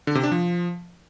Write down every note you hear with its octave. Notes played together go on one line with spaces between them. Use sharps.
D3
C3
D4
F3